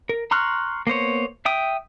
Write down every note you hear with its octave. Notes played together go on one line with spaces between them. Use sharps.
A#4
A#5 C6 C#6 F6 F#6
A#3 B3 C5 C#5
E5 G5 D#6